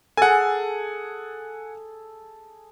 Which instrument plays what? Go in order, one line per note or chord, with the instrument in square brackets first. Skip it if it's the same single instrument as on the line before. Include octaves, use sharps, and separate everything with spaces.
[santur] G#4 A4 [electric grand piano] F#5 G#5